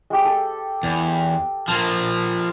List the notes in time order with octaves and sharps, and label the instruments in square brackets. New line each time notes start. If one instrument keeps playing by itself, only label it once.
[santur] G#3 G4
A4
[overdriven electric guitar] E2
[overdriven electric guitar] F3 A#3 [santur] A5